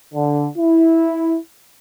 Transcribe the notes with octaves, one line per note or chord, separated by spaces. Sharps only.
D3
E4